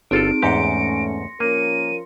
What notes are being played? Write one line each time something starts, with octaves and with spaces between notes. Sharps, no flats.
G1 C4 D#4 F4 G#4 A4 D7
E2 G#2 A3 C#4 G4 C6 A#6 C#7
F3 A#3 C#4 A#4 D#7